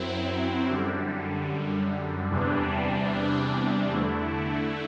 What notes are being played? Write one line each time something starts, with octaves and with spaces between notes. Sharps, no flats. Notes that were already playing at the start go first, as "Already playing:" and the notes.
Already playing: F#2 F#3 C4 E4
F#2 D3 G3
E2 C3 E3 G3 D4
D3 A3 E4